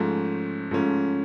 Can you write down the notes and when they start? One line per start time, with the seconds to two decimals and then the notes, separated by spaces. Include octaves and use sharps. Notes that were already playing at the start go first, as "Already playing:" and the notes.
Already playing: G#2 F3 A3 C#4
0.71 G#2 F3 A3 C#4